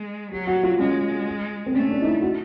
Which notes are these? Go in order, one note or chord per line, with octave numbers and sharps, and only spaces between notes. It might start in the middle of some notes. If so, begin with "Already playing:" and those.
Already playing: G#3
F#3 G4
F#4
F4
G#3 C#4
C4
A3 C#4
D4
D#4
E4
F#4